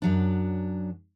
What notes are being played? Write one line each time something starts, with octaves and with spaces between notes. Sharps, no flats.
F#2 F#3 D4